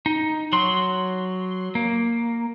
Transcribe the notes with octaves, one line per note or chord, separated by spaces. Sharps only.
D#4
F#3 C6
A#3